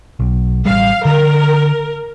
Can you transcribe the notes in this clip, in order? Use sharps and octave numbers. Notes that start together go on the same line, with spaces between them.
B1
A1 G3 F5
D3 A#4